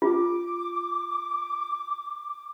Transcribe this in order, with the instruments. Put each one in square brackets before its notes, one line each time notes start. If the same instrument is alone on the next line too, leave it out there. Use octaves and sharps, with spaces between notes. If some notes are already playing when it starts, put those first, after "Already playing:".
[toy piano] F4 [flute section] D6